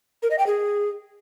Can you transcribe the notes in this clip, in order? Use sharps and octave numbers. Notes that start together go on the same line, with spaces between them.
A#4
D#5
G5
G#4